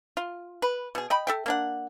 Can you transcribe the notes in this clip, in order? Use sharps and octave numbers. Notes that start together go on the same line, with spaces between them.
F4
B4
B2 G#4
D#5 G5 B5
A4 E5 G5
A#3 D4 F#5